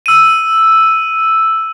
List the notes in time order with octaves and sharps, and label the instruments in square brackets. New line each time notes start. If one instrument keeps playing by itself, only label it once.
[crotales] E6 D#7